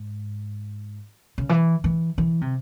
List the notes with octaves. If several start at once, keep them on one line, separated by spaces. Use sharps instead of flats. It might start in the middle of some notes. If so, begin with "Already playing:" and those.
Already playing: G#2
C#3
E3
E3
E3
C3